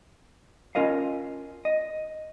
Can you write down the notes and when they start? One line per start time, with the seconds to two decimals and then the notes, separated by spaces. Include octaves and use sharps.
0.75 C#4 F4 A#4 D#5 F5
1.65 D#5